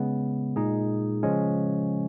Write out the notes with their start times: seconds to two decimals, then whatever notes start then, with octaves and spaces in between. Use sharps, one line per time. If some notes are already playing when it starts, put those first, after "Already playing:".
Already playing: C#3 G#3 B3
0.56 A#2 G#3 D#4 G#4
1.23 C#3 F3 G#3 C#4